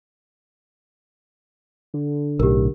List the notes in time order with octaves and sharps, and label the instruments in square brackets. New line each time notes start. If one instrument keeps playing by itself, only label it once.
[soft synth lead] D3
[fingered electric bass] B1 A2 [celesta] G4 A#4